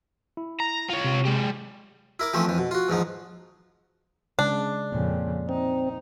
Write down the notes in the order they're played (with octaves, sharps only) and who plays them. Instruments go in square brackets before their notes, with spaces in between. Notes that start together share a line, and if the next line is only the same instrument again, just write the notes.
[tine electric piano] E4
[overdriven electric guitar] A#5
F4 C#5
[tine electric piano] C3
[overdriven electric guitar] G#3 G4
[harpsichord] E4 A#4 D6
E3 F3 A3 C4 C#4
F2 E3
B2
F4 F#4
E2 G#2 F3 D#4
[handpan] C#3 G#3 [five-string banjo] D4
[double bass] F2 C#3 [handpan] A#2 A#3
[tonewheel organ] C4 [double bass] D#4